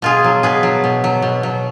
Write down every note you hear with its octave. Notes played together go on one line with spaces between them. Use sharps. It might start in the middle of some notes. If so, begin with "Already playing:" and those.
B2 F4 G#4
F#3
B2 G#4 B4
F#3
B2
F#3
B2
F#3